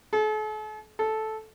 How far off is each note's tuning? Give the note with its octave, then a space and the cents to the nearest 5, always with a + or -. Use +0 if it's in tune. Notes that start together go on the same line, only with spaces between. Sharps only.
A4 -45
A4 -10